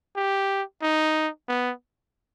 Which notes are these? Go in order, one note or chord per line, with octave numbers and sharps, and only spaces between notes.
G4
D#4
B3